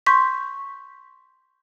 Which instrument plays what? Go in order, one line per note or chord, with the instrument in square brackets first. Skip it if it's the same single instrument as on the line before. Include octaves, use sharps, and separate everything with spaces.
[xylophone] C6 C#6 G6 B6